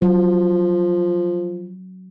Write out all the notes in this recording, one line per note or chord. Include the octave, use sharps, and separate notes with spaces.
F3 F#3